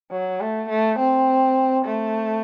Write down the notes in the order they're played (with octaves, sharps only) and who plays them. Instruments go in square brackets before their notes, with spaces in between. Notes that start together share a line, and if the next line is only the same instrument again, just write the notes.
[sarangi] F#3
A3
A3
C4
A3